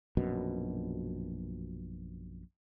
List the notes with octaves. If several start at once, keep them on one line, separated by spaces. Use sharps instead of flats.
A#1 F#2 B2